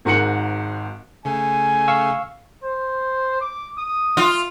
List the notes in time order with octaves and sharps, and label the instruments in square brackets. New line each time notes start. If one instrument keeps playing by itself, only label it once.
[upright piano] G#1 G#2 F#4 A#4 C#7 F#7
[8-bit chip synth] C#3 A3 [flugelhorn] G#5
[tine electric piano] F5 C#6 E6
[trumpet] C5
D6
D#6
[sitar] F4